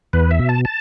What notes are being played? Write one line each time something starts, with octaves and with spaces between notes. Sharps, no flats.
E2 B4
E5
B2
A5
A5